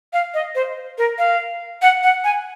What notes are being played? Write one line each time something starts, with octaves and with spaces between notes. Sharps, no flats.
F5
D#5
C5
A#4
F5
F#5
F#5
G#5